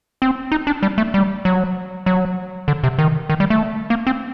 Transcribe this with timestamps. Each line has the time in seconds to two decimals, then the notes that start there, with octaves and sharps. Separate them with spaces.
0.22 C4
0.52 D#4
0.67 D4
0.83 G3
0.98 A3
1.14 G3
1.45 F#3
2.06 F#3
2.68 D3
2.84 C3
2.99 D#3
3.30 D#3
3.40 G3
3.50 A3
3.90 A#3
4.07 C4